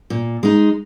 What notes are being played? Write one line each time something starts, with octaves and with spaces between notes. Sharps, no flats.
A#2
G#3 D#4